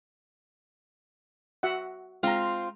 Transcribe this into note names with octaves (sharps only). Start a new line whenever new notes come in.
F#4 E5 F#5
G#3 C4 F4 A#5